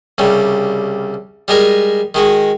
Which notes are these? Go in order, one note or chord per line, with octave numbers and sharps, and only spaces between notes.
C2 C#3 G3
G3 G#3 A#4 G#5
D#3 G#3 F#4